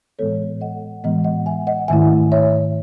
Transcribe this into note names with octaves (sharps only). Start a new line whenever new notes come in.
A2 E3 G#3 B3 A4 C#5
D#5 F#5
A2 E3 G#3 B3 D#5 F#5
D#5 F#5
E5 G#5
D#5 F#5
G#2 D#3 A3 E4 E5 G#5
C#5 E5